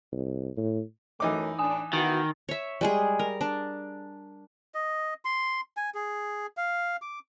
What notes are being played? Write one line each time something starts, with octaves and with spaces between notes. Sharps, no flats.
C2
A2
F#2 E3 A3 D#4 D6
A2 D4 G#5 D#6
D#3 B3 E4 F#4 A6
C#5 E5
G3 G#3 G#4
A#4
D4
D#5
C6
G#5
G#4
F5
D6